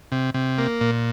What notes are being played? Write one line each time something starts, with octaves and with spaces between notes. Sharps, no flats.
C3
C3
A#3
A#2